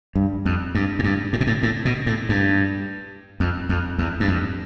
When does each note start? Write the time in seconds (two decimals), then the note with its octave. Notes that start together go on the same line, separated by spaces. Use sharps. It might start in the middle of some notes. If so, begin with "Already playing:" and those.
0.16 G2
0.45 F2
0.75 G2
0.99 A2
1.04 G2
1.33 A2
1.41 B2
1.47 A2
1.63 A2
1.85 B2
2.06 A2
2.29 G2
3.40 F2
3.69 F2
3.98 E2
4.20 G2
4.28 F2